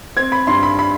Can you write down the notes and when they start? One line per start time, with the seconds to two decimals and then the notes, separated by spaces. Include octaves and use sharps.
0.17 C4 G#6
0.32 B5
0.47 G2 C6
0.63 B5
0.79 B5